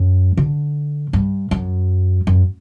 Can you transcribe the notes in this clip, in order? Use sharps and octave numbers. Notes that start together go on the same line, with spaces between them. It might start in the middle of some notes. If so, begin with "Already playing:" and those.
Already playing: F#2
D3
G2
F#2
F#2